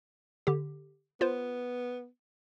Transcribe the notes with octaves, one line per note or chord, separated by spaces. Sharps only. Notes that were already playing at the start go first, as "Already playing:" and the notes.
D3 G4
B3 F4 C5